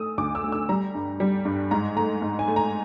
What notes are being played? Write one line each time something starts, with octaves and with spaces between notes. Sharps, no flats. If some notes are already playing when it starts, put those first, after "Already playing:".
Already playing: A3 D#6 E6
D2 D6
E6
A3
E6
G3 A#5
G2
G3
G2
G#2 A#5
A3 A#5
G#2
G#5
A3
A#5